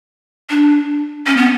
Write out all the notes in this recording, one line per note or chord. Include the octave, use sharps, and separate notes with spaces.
D4
C#4
B3